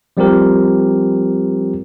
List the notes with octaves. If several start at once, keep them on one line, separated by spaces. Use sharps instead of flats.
F3 G3 C4 F4 G4 A#4